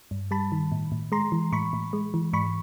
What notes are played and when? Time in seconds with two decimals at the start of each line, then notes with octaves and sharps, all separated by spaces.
0.11 G2
0.31 G3 A5 B5
0.52 D#3
0.72 A2
0.92 A2
1.12 G#3 A#5 C6
1.32 E3
1.52 A2 B5 C#6
1.73 A2
1.93 G#3
2.14 E3
2.33 G#2 B5 C#6